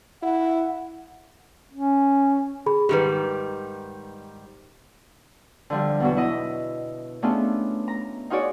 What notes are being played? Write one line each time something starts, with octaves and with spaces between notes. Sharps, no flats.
E4 F#5
C#4
G#4 B5
G#2 D#3 G3 G4 B4
D3 F3 G3
E2 B2 F#3
E4 D#5
A3 B3 C#4 D4 F4 G#4
A#5
D#4 F4 F#4 G#4 C#5 D5